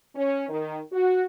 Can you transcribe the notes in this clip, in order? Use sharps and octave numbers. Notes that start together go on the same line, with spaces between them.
C#4
D#3
F#4